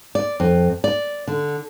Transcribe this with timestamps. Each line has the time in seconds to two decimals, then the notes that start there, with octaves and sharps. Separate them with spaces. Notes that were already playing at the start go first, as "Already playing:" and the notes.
0.15 D5
0.40 F2
0.84 D5
1.28 D3